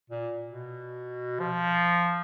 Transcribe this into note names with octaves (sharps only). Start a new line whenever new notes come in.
A#2
B2
F3